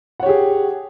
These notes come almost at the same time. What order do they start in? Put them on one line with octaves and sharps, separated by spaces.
F#5 C#5 G4 G#4